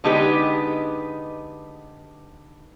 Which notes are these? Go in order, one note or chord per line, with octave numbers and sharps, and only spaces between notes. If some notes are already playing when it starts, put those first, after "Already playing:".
D3 G#3 B3 D#4 G4 B4